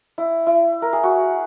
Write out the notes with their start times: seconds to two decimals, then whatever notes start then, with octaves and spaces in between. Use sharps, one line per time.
0.18 E4
0.46 E4
0.82 A#4
0.93 G#4
1.03 F#4